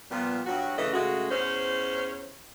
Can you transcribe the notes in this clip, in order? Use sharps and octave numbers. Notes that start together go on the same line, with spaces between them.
A#2 F3 G3 B3
G2 F#3 F#4
C#3 E3 A3 D#5
C#3 G#3 A3 F#4
E2 C#4 C5